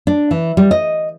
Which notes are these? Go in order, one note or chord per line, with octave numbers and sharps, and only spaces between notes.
D4
E3
G3
D#5